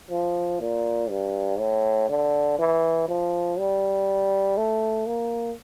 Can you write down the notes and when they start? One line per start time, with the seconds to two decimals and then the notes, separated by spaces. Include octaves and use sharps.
0.11 F3
0.60 A#2
1.10 G2
1.59 A2
2.09 D3
2.59 E3
3.08 F3
3.58 G3
4.58 A3
5.07 A#3